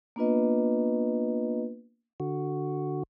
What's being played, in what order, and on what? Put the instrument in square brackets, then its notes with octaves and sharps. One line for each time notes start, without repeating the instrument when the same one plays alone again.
[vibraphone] A#3 B3 D4 F4 B4 D#5
[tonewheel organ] D3 F#4